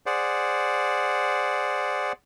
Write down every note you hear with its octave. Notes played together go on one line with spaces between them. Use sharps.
G#4 C5 D5 F#5